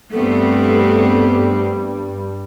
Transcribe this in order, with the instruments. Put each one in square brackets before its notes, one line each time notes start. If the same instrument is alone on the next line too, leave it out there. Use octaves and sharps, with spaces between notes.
[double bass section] G2 G3 [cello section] A3 B3 C4 [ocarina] A4